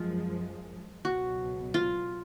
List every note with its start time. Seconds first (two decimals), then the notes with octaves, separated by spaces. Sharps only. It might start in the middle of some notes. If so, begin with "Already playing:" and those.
Already playing: F#2 F3 G#3 F4
1.05 C#2 B2 F#3 F#4
1.74 F4